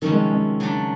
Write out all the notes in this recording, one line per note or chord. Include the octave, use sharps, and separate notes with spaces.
C3 D#3 F3 A3 C#4
G#3
G#3
C#3 F#3 A3 D4